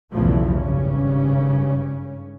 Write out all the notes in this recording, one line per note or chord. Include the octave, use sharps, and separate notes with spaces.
B1 E2 G2 C#3 F3 A3
G#1 G2 C#3 C#4